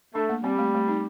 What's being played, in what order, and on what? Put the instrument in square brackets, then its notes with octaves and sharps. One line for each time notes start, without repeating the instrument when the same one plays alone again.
[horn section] A3 [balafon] D4
[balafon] A#3
[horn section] G3 [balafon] C4
[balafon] A3
A3
D#4